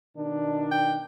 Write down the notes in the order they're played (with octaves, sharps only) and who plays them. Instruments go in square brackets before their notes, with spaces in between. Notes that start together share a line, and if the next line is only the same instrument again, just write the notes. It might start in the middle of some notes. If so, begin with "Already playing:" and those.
[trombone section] B2 D#3 D4
[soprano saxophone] G5